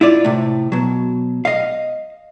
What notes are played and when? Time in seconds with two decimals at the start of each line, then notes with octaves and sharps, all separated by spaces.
0.01 E4 F4 D5
0.25 A2 C3
0.72 B2 F#3
1.45 D#5 F5